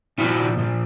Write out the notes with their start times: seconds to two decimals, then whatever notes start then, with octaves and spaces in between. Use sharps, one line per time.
0.18 A#2 F3 E4 F#4
0.57 A#2 F3